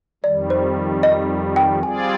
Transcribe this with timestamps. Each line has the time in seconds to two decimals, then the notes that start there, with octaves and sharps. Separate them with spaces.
0.24 F2 D#3 G3 D5
0.50 C5
1.03 D#5
1.56 G5
1.83 G3 C4 F4 G#4 D5 G#5